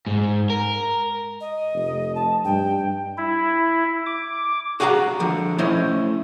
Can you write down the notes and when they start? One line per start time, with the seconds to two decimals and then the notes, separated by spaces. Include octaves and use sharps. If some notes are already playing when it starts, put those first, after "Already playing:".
0.06 G#2
0.50 A#4
1.41 D#5
1.73 F1
2.15 A5
2.45 G2 G5
3.17 E4
4.06 D6
4.80 F#4 G#4 F5 F#5 G#5 A#5
5.20 D3 F3
5.58 A3 C#4 E4 C5 D#5